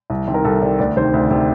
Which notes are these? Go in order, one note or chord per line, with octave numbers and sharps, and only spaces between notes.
C2
C3 D#3
A#4
C2 A4
C3 D#3 D5
D2 D5
C3 D#3 C5
D2
C3 D#3